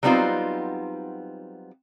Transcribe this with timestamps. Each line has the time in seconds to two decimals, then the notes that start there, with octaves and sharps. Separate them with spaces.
0.03 F#3 G3 B3 C4 D#4 F4